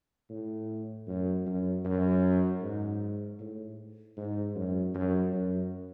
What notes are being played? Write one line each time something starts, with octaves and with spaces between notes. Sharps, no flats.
A2
F#2
F#2
F#2
G#2
A2
G#2
F#2
F#2
F#2